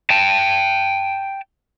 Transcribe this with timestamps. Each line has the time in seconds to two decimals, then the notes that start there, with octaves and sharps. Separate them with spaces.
0.10 G5 A5